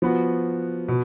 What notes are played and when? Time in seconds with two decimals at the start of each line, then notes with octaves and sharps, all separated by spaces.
0.02 F3 B3 F#4
0.88 B2